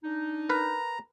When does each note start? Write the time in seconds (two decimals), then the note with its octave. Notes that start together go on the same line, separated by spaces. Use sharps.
0.04 D4 D#4
0.49 A#4 B4 A#5